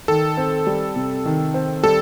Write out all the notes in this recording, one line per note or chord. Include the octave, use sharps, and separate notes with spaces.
D#3 A4
C4
G3
C3
D#3
C4
G3 A4